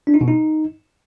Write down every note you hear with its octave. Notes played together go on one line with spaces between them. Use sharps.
D4
D#4
B2
D#4